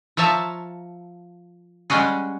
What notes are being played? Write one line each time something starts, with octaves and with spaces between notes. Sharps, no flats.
F3 C#5 E5 A5 A#5
G3 G#3 C#4 F#4 G#4